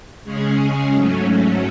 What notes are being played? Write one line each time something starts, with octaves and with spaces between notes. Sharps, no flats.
C#3 G#3 C#4 G#4
G#2 F#3 A3 C#4